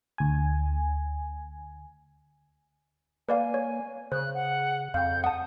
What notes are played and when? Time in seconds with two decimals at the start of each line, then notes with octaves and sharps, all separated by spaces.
0.18 D2 G#5
3.29 A#3 B4 D5 F5 G#5
3.54 C#5
4.12 C#3 C5 F#6
4.34 F#5
4.94 F2 F5 G5 G6
5.24 F#5 A5 D#6